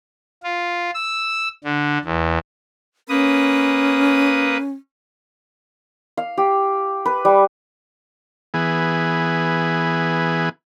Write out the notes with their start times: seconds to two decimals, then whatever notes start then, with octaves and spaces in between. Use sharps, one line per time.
0.43 F4
0.94 E6
1.64 D3
2.05 E2
3.09 A#3 C#4 B4 D#6
6.17 F5
6.38 G4
7.06 B4
7.25 G3
8.54 E3 B3 G#4